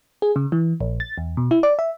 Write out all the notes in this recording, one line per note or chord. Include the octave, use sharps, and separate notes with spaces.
G#4
C#3
E3
A#1
A6
E2
B2
E4
D5
E5